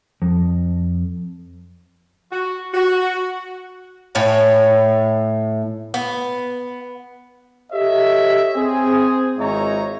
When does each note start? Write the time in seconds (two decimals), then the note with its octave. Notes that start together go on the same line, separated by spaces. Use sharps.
0.22 F2
2.32 F#4
2.74 F#4
4.15 A2 C#5 G#5
5.94 B3
7.72 G4 A4 C#5 D#5 E5
8.55 C4 G#4
9.38 G#1 G#2 D#4 E4 C#5 A#5